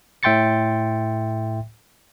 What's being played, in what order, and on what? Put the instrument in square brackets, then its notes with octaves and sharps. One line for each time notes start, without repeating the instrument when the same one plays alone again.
[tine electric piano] A2 E5 G5 C6 A6 C#7